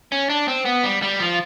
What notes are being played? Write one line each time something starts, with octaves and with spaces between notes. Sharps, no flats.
C#4
D4
C4
B3
G3
G3
F3